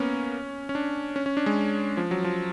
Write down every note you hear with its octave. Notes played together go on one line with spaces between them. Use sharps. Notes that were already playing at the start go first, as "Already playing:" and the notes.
Already playing: A#3 B3 C#4
C#4
D4
C#4
C#4
D4
G#3
F3
F#3
F3